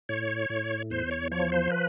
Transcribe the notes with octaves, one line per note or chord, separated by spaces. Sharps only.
A2 C#5
A2
E2 C5
C#5
F3 C#5
C5
B4